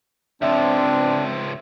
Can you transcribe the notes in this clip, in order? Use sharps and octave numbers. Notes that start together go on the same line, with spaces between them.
C#2 F3 C4 D4 E5